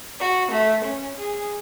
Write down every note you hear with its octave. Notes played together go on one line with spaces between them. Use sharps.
F#4
A3
C#4
G#4